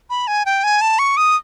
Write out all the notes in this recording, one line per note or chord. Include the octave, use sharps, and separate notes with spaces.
B5
G#5
G5
G#5
A5
C#6
D#6